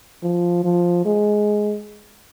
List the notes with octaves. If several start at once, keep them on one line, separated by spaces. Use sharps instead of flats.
F3
F3
G#3